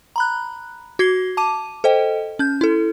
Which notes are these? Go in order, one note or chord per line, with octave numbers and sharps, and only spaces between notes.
A#5 B5 F#6
F#4 G#6 C7 G7
A5 D6 D#7
A4 C5 D#5 G5
C#4 G6
E4 A4